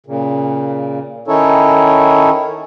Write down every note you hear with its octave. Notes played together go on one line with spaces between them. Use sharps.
A#2 C#3
D#3 C#4 D#4 E4 A4 C#5